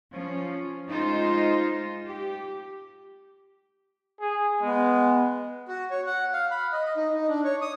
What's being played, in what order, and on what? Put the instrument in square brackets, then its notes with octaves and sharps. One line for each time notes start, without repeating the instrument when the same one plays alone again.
[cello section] F3 C#4
G#3 D#4 F4 C5
G4
[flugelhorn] G#4
[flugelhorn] G#3 [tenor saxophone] B3
[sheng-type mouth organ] F#4
C#5
F#5
F5
B5
D#5
D#5
D#4
D#4
D4
C#5
D#6